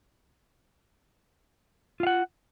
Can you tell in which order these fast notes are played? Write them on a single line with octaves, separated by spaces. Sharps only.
F4 F5 F#5